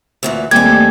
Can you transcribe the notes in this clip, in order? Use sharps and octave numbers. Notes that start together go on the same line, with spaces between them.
D2 A#2 E3
D#2 G3 C4 G4 G#5 G#6
A3 A#3 A4